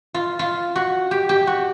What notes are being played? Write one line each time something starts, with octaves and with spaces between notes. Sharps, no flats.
F4
F4
F#4
G4
G4
F#4